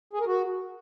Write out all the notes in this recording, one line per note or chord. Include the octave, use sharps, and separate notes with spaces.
G#4
A#4
F#4